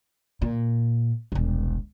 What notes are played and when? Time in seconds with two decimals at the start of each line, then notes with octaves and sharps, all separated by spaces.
0.42 A#2
1.32 E1 C2